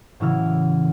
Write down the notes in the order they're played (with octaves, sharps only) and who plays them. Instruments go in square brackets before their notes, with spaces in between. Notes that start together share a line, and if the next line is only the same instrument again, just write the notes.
[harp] A2 C#3 E3 F#3 E4 F6